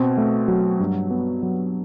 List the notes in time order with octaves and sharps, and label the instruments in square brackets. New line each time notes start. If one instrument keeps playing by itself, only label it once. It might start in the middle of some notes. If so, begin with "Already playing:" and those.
Already playing: [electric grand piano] B2 C4
A3
F#3
G2
B3
F#3